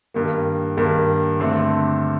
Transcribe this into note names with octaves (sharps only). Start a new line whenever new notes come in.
G2 D#3 A#3
G2 D#3 A#3
G2 D3 A3 C4